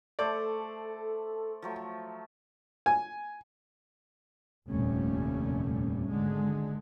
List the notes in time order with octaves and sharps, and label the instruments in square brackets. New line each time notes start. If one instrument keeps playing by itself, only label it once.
[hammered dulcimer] A3 C5 [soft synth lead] A4 [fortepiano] D5
[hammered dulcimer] F3 F#3 A3
[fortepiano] G#5
[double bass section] F1 D#2 A#2 G3 A3 C#4
G#1 D3 G#3